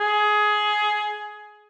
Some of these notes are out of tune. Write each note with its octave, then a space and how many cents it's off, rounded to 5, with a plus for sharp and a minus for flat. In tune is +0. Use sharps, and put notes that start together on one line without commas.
G#4 +15